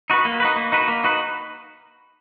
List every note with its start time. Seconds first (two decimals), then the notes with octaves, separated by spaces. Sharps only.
0.10 D#4 F#4 B4
0.25 A#3
0.40 D#4 F#4 B4
0.56 A#3
0.72 D#4 F#4 B4
0.88 A#3
1.04 D#4 F#4 B4